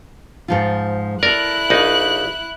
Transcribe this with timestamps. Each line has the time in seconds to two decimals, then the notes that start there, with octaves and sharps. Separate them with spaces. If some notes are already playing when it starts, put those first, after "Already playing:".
0.48 G#2 F3 F4
1.23 E4 A4 A#4 D5 F#6
1.70 A#1 D#4